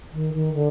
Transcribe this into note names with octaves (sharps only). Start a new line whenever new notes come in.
D#3
D#3
D3